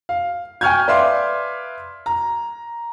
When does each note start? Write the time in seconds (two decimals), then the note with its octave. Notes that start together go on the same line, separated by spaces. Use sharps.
0.09 F5
0.61 G5 G#5 C#6 F6 G6 G#6
0.88 B4 D5 E5 F5 C6 D6
2.06 A#5